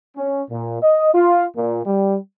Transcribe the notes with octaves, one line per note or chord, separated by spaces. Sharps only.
C#4
A#2
D#5
F4
A#2
G3